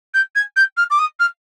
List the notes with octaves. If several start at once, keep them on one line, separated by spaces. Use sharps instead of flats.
G6
G#6
G6
F6
D6
D#6
F6